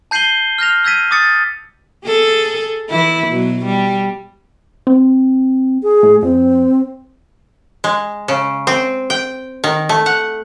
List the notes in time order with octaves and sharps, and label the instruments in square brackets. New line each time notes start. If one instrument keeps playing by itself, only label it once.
[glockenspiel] A5 G6 C7 D#7 F#7 G7
F6 G6 A#6 F7
E6 G6 G#6 A#6 B6 D#7
D6 D#6 A6 C#7
[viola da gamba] G#4 A4
E3 E4
B2 F#3
G3
[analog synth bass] C4
[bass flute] G#4
[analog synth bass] A2
[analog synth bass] F2 [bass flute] C4
[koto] G#3
C#3
C4
G5
D#3
A3
F#5